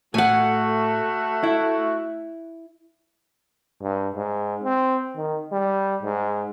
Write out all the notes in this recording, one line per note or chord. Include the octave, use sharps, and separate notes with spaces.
A2 A3 F#4 F#5 G#5
E4
G2
G#2
C4
D#3
G3
G#2